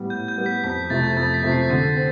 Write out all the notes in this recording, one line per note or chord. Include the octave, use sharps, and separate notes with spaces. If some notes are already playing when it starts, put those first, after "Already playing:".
Already playing: A2 G3 B3
A2 G6
G6
G3 B3
B6
F2 B6
C3 F3 A3 C4 A6
G6
F2 A6
B6
C3 F3 A3 C4
C7
D3
C4